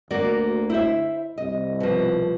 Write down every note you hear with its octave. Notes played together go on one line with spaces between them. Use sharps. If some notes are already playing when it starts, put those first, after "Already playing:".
D2 A#3 F#4 D5
E4 C5 E5
C2 D#5
B2 F3